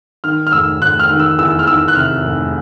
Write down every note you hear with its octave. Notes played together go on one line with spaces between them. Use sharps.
D#3 F6
F6
F1 E6
F1 F#6
F6
D#3
E6
E2 E6
F6
D#3 E6
F#6
C3 F6
F1